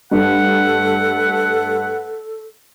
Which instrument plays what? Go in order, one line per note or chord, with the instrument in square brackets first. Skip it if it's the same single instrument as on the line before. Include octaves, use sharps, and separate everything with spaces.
[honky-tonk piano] G2 [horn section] A3 B4 F#5 [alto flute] A4